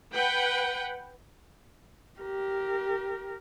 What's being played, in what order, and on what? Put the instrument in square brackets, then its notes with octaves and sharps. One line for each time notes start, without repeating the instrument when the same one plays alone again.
[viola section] B4 F#5 G5
[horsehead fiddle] G4 A#4